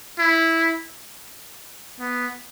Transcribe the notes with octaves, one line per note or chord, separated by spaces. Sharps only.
E4
B3